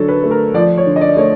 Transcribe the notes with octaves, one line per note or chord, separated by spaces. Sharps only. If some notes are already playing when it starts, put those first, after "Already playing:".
Already playing: D3 F#3 A4
B4
A3
A#4
F3 D5
C#5
D3
D#5
D5
A3 C#5